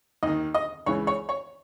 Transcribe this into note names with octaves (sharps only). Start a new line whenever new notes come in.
D#2 D#3 D#5
D#5
C#2 C#3 E3 C#5
C#5
C#5